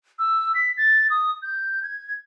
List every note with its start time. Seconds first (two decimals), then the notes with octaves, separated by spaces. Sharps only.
0.19 E6
0.55 B6
0.77 A6
1.10 D#6
1.42 G6
1.83 G#6